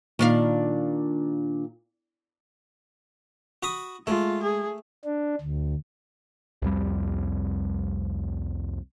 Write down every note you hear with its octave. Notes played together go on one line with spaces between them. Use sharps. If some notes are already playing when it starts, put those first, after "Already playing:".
A#2 D#3 D4 F5
F#4 B5 D#6
G#3 A3 F4
G#4
D4
D2
C2 F2 G3